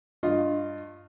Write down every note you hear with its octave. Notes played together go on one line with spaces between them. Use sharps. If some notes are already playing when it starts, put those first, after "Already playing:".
G2 F4 D#5